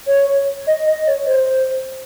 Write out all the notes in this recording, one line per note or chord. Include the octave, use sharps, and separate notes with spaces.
C#5
D#5
D#5
C#5
C5